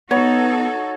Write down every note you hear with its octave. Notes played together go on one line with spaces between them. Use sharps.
B3 D#4 F#4 A4 C#5 F#5